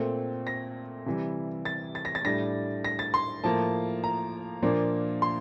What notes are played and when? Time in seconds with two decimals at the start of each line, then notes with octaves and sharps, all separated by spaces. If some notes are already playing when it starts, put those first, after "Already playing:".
Already playing: A#2 A3 C4
0.47 A#6
1.06 C3 E3 G3
1.65 A6
1.95 A6
2.05 A#6
2.15 A6
2.25 A2 G3 D4 A#6
2.84 A#6
2.99 A6
3.14 C6
3.44 A2 F3 A#3 A5
4.04 A#5
4.62 A#2 F3 A#3 D4
5.22 C6